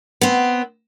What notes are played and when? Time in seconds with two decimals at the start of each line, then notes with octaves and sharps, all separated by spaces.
0.21 B3 C4